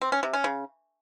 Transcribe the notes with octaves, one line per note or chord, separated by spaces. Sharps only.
C4
C#4
C3
C#4
C#3